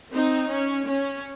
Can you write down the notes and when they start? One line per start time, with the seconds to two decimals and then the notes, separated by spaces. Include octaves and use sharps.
0.12 C4 D#4
0.49 C#4
0.87 C#4